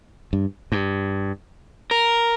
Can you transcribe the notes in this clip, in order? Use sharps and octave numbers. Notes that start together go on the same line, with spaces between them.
G2
G2
A#4